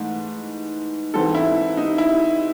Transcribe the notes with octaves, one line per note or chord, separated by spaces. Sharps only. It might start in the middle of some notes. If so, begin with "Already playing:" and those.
Already playing: G#2 E3 A3
G#2 E3 C4 A4
E4
D#4
E4